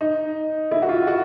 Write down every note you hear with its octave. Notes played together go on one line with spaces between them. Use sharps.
D#4
E4
F#4
F4
F#4